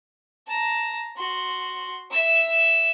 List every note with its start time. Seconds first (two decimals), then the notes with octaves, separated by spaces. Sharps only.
0.47 A5 A#5
1.16 F#4 C6
2.10 E5 E6